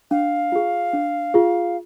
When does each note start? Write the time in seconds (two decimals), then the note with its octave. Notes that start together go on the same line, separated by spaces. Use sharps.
0.11 D4 F5
0.52 F4 G#4
0.93 D4
1.34 F4 G#4